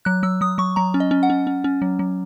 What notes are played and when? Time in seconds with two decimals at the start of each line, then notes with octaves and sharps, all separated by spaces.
0.05 F#3 F#6
0.23 F#3 E6
0.41 F#3 D#6
0.58 F#3 C#6
0.76 F#3 A#5
0.94 C#4
1.00 D#5
1.11 C#4
1.23 F#5
1.30 C#4
1.47 C#4
1.64 C#4
1.82 F#3
1.99 F#3